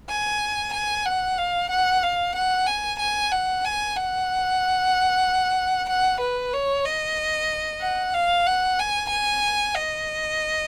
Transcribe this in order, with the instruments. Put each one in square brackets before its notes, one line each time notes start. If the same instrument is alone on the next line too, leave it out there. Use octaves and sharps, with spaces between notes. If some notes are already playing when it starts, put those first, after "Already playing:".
[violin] G#5
G#5
F#5
F5
F#5
F5
F#5
G#5
G#5
F#5
G#5
F#5
F#5
B4
C#5
D#5
F#5
F5
F#5
G#5
G#5
D#5